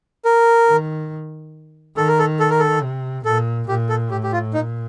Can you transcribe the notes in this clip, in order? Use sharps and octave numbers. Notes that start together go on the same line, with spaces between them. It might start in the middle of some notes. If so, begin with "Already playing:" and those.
A#4
D#3
D#3 A4
A#4
A4
A4
A#4
A4
C3
A#2 A4
A#2 G4
A4
A2 G4
G4
F4
A#2 D#4